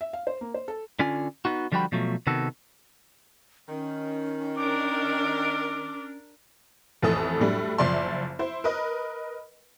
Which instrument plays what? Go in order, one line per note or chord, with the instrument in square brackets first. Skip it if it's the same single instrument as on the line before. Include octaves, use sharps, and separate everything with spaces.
[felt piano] E5
F5
C5
A#3
C5
A4
[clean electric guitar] D3 C#4 F4 G#5
B3 D#4 F#4
D3 F3 G3 F#4 G5 B5
B2 F3 F#3 A3
C3 D#3 B3 F#4 A4
[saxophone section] D#3 [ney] C#4
[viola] D4 A#4 [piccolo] D6
[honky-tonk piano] A1 F2 E3 A3 A4 D#6
A2 F#3 G3 A3 D4
F#1 F3 D5 E5 C6
E4 C5
A#4 B4 D#5